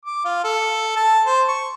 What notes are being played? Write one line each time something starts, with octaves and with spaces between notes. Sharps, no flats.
D6
F4
A4
A5
C5
C#6